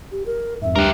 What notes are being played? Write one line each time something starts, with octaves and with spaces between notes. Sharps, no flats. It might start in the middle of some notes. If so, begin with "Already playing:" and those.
G4
A#4
F2 G#2 E5
D2 G2 D4 G4 A#4 F#6